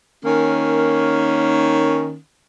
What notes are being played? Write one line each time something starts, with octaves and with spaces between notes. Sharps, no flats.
D#3 A#3 C#4